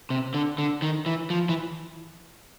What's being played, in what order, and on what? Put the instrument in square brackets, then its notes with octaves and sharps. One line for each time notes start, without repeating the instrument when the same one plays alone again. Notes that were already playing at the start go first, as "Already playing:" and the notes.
[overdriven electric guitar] C3
D3
D3
D#3
E3
F3
E3